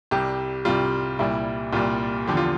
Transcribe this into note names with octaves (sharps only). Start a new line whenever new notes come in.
C2 C3 G3 G4
C2 C3 G3 F4
C2 A#2 G3 E4
C2 A#2 G3 F4
E2 D3 F3 G4
F4